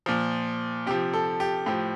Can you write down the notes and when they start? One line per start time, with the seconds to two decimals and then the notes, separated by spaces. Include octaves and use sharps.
0.06 A#2 F3
0.86 C3 G4
0.91 F3
1.14 A4
1.40 G4
1.66 A2 F3 G4